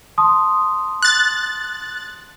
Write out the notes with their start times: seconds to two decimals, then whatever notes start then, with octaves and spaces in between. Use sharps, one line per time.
0.18 A5 C6 D#6
1.02 F#6 A6